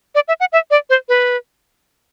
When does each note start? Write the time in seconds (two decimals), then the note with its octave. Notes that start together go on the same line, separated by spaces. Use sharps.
0.15 D5
0.28 E5
0.40 F#5
0.52 E5
0.71 D5
0.90 C5
1.09 B4